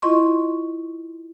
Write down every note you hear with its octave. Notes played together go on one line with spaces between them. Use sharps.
E4 F4 D#5 C6 C#6